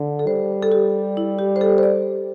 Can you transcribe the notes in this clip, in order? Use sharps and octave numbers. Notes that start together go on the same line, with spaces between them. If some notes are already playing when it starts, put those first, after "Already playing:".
Already playing: D3
A4
G3 C5
A4
G4
E4
G4
C5
A4
C5
D5